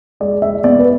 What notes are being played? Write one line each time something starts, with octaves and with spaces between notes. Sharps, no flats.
G#3 D5
E5
B3 D5
B4